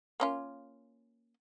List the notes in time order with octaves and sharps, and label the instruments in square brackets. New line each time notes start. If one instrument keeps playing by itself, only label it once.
[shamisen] A#3 C#4 F4